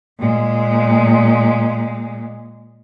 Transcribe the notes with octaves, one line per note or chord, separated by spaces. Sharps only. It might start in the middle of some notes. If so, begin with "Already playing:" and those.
A#2 G#3